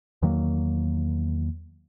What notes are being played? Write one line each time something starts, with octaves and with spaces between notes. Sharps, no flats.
E2 D#3 F#3 A#3